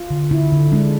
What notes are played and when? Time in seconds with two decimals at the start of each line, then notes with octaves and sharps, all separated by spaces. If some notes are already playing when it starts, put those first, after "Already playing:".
Already playing: F4
0.10 D3
0.31 D3 E4
0.52 D3
0.72 G#3 D4